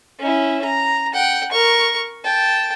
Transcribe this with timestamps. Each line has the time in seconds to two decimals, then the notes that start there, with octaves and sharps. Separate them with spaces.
0.19 C#4 E4
0.65 A#5
1.14 F#5 G5
1.52 A#4 C#6
2.25 G5 A5